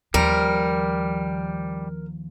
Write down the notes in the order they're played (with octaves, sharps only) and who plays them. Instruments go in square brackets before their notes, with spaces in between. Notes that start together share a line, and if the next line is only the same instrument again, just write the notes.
[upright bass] D#2 [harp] F3 [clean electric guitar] G3 [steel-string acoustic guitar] A#4